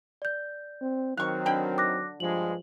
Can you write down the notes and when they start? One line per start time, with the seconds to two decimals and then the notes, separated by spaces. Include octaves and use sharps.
0.22 D5 G6
0.82 C4
1.17 D#3 F#3 C4 F5 C#6 F#6
1.46 D3 G5 B5
1.78 D6 F#6 A#6
2.20 G2 F3 G#3 F#7